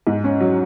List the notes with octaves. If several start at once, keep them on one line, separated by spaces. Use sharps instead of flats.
G#2
C#4
F#3